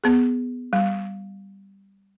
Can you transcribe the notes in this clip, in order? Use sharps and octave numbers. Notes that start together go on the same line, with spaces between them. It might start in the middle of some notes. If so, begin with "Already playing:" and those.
B3 G#4
G3